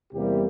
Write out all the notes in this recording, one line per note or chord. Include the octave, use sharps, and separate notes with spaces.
E2 C3 G3 A#3 G4